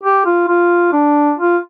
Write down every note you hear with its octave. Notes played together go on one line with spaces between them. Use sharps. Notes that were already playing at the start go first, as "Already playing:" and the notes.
G4
F4
F4
D4
F4